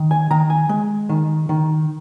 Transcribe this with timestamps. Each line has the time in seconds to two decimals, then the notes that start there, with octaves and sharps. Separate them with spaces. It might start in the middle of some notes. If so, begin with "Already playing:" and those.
Already playing: D#3
0.11 G#5
0.31 D#3 A#5
0.50 G#5
0.69 G#3
1.09 D#3
1.49 D#3